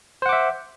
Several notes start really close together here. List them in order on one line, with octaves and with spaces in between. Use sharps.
C5 F#5 D6 E5